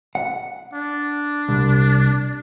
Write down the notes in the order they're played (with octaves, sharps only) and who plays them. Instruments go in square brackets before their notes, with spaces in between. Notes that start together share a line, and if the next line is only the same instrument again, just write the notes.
[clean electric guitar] F#5
[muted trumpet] D4
[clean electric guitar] C2